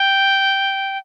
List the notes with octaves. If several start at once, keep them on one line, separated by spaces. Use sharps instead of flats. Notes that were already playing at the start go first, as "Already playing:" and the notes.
Already playing: G5